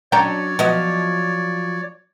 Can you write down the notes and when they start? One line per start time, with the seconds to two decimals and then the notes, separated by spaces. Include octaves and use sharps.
0.12 F#3 C#4 D4 C#5 D5 G5 A#5
0.59 F3 F#3 B3 D#5